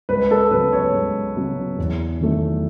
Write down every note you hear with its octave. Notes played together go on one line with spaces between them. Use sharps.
C#2 B4
A4
C#3 F#3 B3 B4
C#5
C#2
C#3 F#3 B3
E2
D#3 F#3 A3